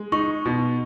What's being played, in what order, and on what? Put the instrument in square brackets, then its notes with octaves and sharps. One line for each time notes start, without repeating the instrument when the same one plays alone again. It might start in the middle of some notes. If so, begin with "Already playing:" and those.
Already playing: [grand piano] G#3
[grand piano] D#4 [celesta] C#6
[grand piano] B2